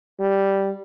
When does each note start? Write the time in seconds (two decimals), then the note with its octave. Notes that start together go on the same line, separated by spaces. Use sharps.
0.20 G3